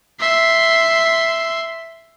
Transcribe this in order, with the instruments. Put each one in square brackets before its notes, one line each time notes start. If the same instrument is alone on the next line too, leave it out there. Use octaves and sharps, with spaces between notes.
[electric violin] E5 C6